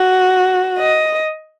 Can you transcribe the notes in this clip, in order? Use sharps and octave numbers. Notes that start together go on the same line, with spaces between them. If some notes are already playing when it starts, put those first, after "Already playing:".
Already playing: F#4
D#5